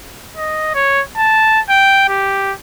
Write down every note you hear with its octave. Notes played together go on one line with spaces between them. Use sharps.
D#5
C#5
A5
G5
G4